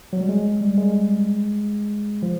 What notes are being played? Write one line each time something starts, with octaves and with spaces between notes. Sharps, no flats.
F#3
G3
G#3
G3
G#3
F3